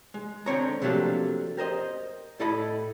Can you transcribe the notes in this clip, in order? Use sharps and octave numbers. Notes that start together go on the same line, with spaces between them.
G#3
D3 C4 C#5 A#5
C3 F3 F#3 A3 A#3 D4
G4 A#4 C5 D#5
A2 E4 A4 D#5 B5